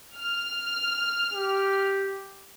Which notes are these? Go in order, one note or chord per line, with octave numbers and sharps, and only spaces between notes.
F6
G4